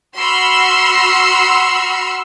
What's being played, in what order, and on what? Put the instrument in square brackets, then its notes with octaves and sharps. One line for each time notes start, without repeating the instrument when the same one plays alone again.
[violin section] F#4 B5 C6 E6 F6